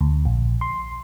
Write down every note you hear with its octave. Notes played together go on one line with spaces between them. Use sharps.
D2
A#1
C6